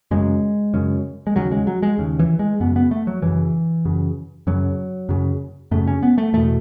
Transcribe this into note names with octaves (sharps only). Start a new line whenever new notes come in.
F#2 C#3 G#3
F#2 C#3
G#3
D#2 C#3 F#3
G#3
F#3
G#3
D#2 C#3
E3
G#3
F#2 C#3 B3
B3
A3
F#3
F#2 C#3 E3
F#2 C#3
F#2 C#3 F#3
F#2 C#3
F#2 C#3 A3
C#4
B3
A3
E2 B2 A3